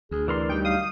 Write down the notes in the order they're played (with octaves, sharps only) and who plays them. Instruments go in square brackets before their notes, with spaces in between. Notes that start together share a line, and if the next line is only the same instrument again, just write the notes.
[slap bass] D2 [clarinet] G#4
[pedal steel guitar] E3 A#4 C6 [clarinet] D5
[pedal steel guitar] F#3 G3 D#4 [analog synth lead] G5
[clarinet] F5 [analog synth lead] D#6